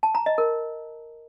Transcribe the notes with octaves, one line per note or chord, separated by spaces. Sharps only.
A5
A#5
D#5
A#4